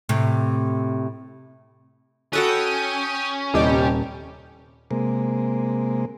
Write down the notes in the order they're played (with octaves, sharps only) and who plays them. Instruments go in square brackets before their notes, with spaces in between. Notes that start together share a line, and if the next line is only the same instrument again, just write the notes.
[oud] A2 C3
[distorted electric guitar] C#4 [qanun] F#4 A4 B4 [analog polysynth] G5 D#6
[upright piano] D#1 D#5 [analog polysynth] C3 G3 G4
[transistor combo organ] C3 G#3 A#3